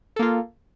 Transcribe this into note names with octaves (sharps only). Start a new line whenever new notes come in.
A#3 F4 A4